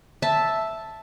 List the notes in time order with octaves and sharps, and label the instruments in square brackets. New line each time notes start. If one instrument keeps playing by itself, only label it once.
[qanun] E5 A5